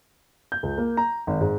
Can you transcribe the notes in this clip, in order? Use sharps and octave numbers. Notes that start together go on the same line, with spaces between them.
G6
C#2
A#3
A#5
G#1
G#2